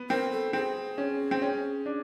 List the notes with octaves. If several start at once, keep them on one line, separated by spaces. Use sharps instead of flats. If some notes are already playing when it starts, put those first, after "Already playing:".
Already playing: B3
C4 A#4
A4
C4 G#4
C#4
C4
C#4
D4